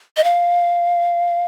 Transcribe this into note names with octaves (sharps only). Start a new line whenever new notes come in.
D#5
F5